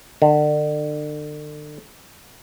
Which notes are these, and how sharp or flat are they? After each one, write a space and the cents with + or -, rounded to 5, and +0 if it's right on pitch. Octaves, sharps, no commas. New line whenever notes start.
D3 +35